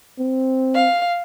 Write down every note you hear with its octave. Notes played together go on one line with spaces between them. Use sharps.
C4
F5